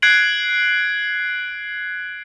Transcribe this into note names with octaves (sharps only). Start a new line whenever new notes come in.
F#6 G#6 C7 D7 F#7